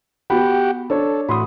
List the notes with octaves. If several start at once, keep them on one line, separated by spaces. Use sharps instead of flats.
B3 F#4 G4 F#5 G5 B5
D4 A4 C#5
A2 F#4 B5 C6 D#6